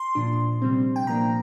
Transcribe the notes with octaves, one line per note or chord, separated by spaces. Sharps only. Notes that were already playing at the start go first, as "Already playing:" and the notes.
Already playing: C6
A#2 F3 D4
C3 G3 C4
G5
A#2 F3 A#3 D4 A#5